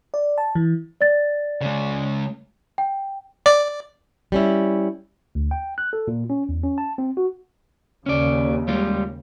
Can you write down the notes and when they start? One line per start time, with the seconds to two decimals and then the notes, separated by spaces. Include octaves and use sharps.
0.14 D5
0.38 A5
0.55 E3
1.01 D5 A6
1.61 C#3 G#3
2.78 G5
3.46 D5
4.32 G3 C#4 E4
5.35 D2
5.51 G5
5.78 F#6
5.93 A4
6.08 A#2
6.30 C#4
6.49 E2
6.64 C#4
6.78 A5
6.98 C4
7.17 F#4
8.06 D#2 C#3 C#4 D5
8.68 G3 G#3 F4